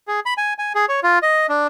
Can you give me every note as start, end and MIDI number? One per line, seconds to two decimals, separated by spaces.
0.08 0.20 68
0.26 0.34 83
0.37 0.54 80
0.59 0.73 80
0.75 0.86 68
0.89 1.00 73
1.03 1.19 65
1.23 1.47 75
1.49 1.67 62